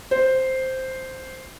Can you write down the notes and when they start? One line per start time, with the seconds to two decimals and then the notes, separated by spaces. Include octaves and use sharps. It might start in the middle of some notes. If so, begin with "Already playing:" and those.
0.11 C5